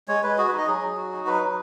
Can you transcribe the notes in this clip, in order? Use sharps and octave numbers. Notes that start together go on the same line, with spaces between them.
G#3 C#5
G#3 B4
F#4 G#4
B4
D#4
D#5
F#3 G#4
F#3
F#4
D#4
F#3 B4
F#3